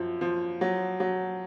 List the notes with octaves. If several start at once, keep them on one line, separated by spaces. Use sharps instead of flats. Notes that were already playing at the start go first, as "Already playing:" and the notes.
Already playing: F#2 F3
F3
F#3
F#3